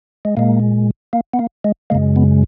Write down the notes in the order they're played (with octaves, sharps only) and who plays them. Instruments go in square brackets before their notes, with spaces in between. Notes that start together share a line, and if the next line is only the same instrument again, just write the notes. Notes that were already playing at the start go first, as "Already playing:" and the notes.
[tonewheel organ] G#3
A#2 G#3 A#3
A#3
B3
A#3
G#3
F#2 C#3 G#3 A#3
B3